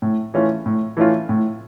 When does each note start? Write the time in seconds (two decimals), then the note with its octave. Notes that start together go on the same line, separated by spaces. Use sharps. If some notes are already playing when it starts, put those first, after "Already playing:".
0.02 A2
0.34 E3 A3 C#4 F4
0.66 A2
0.97 E3 A3 C#4 F4
1.29 A2